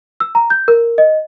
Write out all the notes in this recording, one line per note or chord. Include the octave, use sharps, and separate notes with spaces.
E6
A#5
G6
A#4
D#5